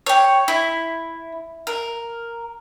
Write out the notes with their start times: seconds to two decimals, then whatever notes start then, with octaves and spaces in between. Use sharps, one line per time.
0.06 G4 C#5
0.48 E4
1.67 A#4